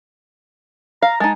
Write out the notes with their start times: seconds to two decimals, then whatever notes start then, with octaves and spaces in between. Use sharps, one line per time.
1.02 F5 A#5
1.20 G#3 D#4 A5